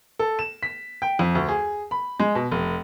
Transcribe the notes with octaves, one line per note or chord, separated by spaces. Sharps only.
A4
E7
B6
G5
F2
D2
G#4
B5
G#3
B2
F1